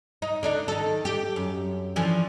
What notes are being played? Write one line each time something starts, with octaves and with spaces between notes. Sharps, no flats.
D#4
D3 D4 D#4
D#3 A4
G4
F#2
D3 E3 F3